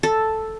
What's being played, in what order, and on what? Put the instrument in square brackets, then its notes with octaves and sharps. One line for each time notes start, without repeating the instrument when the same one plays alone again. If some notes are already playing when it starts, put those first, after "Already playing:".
[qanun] A4